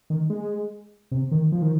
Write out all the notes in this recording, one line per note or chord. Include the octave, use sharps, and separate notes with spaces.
D#3
G#3
C3
D#3
F3
D#3